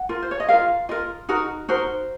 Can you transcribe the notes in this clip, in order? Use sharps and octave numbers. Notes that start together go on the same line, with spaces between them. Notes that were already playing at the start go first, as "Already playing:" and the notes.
Already playing: F#5
F4 A#4
C5
C#5
D#5
F4 A#4 F5
F4 A#4 D#5
D#4 F#4 A#4
D#4 F#4 A#4 C5